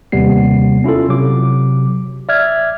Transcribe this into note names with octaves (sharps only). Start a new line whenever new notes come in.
D#2 C3 G3 B3 C7
C#4 E4 F4 A4
C3 F#3 D6
D5 E5 F6 G#6